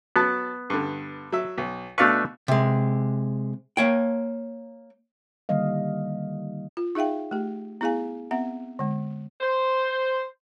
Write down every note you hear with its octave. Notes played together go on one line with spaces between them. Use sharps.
F#3 B3 A5
G2 D3
F#3 E5
B1
B2 A3 D4 B4 F5 C#6
C3 G#3
A#3 C#5 G5
D3 D#3 G3 A#3 D#5 F5
F4
D#4 G#4 E5 F5 G5
A3 G4
B3 E4 G#4 F5 G#5
B3 C4 E5 F#5
D3 G#3
C5